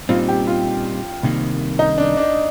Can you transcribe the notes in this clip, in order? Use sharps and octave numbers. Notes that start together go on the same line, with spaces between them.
A#2 G3 C4 D#4 F4
G4
F4
C2 C3 D#3 A#3
D#4
D4
D4